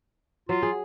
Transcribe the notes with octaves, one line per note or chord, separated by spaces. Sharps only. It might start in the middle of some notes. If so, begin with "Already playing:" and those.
F#3 F4
G#4